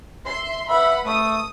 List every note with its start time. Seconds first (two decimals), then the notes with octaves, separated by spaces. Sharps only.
0.25 E5 C6
0.69 B4 E5 F#5 B5
1.06 A3 D#6